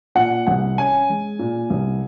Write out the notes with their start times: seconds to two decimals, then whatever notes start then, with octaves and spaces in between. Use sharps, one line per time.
0.15 A#2 F#5
0.47 C2 F#5
0.78 C#4 G#5
1.09 G#3
1.39 A#2
1.70 C2